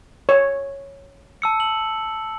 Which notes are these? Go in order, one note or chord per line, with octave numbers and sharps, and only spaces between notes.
C#5
A5 E6 C#7
F#7